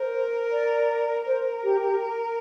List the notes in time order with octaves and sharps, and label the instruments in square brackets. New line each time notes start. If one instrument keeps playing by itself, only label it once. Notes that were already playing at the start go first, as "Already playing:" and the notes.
Already playing: [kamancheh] A#4 [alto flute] C5
[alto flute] D5
[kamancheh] A#4 [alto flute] C5
[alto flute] G4
G4